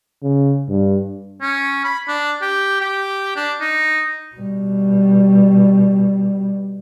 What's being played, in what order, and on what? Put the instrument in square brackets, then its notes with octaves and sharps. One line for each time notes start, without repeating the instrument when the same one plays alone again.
[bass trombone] C#3
G2
[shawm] C#4
B5
D4
G4
G4
D4
D#4
[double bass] B2 G3